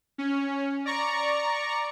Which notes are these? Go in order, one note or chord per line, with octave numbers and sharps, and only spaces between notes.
C#4
D5 A#5 C#6